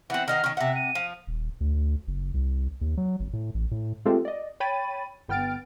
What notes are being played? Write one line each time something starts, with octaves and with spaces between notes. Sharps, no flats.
E3 C4 F#5
D#3 D#4 F#5 F6
D#3 C#4
C3 E5 F#5
D#7
F3
D#1
D2
D2
F#1
C2
D#2
F#3
G1
A2
A1
A2
G#3 A3 C4 F4 G4 A4
D5 D#5
C#5 G5 B5 A6 D#7
G1 B3 G5 F6 A6 D7